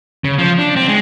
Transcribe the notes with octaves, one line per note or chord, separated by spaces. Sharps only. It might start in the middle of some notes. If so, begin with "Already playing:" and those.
C#3
F3
D4
C4
G#3